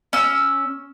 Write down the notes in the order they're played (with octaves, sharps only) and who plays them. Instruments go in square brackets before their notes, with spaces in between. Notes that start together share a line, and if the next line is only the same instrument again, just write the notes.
[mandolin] C#4 E6